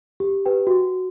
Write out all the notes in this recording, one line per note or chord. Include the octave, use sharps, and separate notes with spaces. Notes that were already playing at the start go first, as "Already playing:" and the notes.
G4
G4 B4 G5
F#4